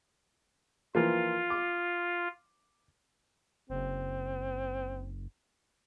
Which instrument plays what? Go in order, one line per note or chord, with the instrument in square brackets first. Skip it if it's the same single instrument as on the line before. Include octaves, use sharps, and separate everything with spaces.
[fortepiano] E3 F3 A#3 [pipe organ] F4
[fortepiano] D6
[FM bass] F#1 [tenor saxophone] C4